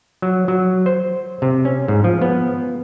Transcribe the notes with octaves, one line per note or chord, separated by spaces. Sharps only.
F#3
F#3
C5
C3
C#4
G#2
F3
B3